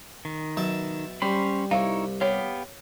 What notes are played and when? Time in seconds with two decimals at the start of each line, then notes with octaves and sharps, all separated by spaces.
0.25 D#3
0.57 B2 F#3 E5 A5
1.22 G3 C#4 C5 B5
1.71 C2 D#4 E4 C#5 F5
2.21 B3 G4 C#5 F5